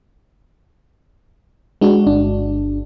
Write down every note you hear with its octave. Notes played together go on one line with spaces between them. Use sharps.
G#3 D4 F#4
G1 D4